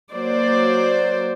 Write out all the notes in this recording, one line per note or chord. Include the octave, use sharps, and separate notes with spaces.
F#3 A#3 C5 D5